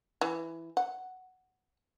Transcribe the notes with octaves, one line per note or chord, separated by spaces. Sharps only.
E3
F#5